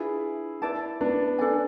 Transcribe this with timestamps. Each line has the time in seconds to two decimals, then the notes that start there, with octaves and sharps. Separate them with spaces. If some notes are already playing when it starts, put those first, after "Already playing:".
Already playing: D4 E4 F4 G#4 B4
0.62 E4 B4 D5 A5
1.01 B3 D4
1.39 D4 A4 D5 G#5